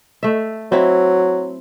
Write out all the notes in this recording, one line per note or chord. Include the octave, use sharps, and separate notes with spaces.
A3 E5
F#3 C4 E4